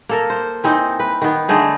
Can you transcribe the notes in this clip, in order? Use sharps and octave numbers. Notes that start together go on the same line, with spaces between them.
A#3 A4 A#4
C5
E3 C4 D#4
B4
D#3 B3
D3 A3 D#4 G#4